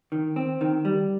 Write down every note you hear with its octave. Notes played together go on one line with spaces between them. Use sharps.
D#3
C4
D#3
G3